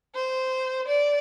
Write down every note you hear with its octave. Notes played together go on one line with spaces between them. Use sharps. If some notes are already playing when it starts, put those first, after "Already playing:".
C5
D5